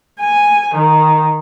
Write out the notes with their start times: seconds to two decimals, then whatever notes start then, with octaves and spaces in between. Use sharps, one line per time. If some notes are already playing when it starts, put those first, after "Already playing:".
0.19 G#5
0.75 D#3